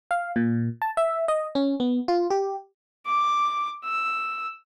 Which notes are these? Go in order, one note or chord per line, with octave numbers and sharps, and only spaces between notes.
F5
A#2
A5
E5
D#5
C#4
B3
F4
G4
D6
E6